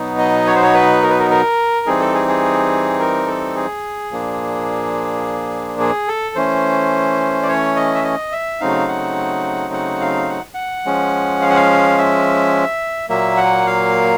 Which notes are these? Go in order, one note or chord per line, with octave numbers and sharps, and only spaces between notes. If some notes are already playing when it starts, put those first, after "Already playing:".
Already playing: B2 F#3 B3 D#4
D#5
C#5
C5
C#5
B4
A#4
B4
A#4
A#4
E3 G3 C4 D#4 G#4
A4
G#4
G#4
A#4
A4
G#4
A#2 F3 A#3 D4
G#4
A4
E3 A3 C#4 C5
D5
C#5
D#5
E5
D#5
E5
C#3 F#3 A3 C4 D#4 F5
F#5
F#5
F5
F#5
F#5
F3 G#3 C#4
F5
F#5
F5
E5
A#2 F#3 A#3 E5
F#5
F5